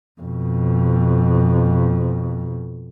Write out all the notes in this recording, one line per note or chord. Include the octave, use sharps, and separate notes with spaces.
F2 B2